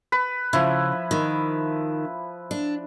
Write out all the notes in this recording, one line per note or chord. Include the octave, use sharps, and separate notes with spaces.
B4
C#3 F3 E4
D#3
D4